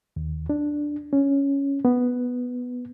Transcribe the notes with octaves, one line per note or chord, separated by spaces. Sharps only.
D#2
D4
C#4
B3